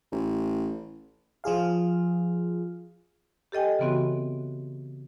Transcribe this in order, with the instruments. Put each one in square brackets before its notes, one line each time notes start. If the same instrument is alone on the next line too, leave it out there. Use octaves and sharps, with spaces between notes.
[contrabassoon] A1
[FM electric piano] F3 F4 G#4 F5
[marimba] G4 A4 D#5 G5 G#5
C#3 E3 B3 C4 F#4